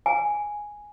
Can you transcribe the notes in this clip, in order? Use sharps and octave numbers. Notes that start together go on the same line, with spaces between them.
G#5